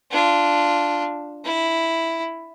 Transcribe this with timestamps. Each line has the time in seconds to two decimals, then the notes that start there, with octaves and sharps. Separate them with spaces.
0.11 D4 F4
1.44 E4